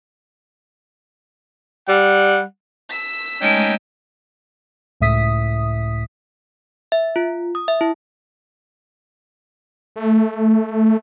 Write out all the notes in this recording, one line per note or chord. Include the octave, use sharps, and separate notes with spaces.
G3 F#5
E6 B6
G#3 A3 C#4 D#4 G5
C#2 A2 E5 D#6 B6
E5
F4
D#6
E5
E4
A3